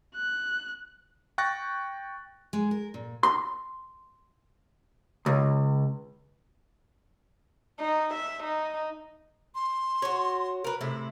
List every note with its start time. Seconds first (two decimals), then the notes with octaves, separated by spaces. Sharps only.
0.15 F#6
1.38 G5 C#6 F#6 A6 A#6
2.53 G#3
2.71 A#4
2.94 A#2
3.23 C6
5.26 C#2
7.80 D#4
8.13 E5
8.43 D#4
9.55 C6
10.02 F#4 C#5
10.64 A#4 B4
10.81 A2 C3 E4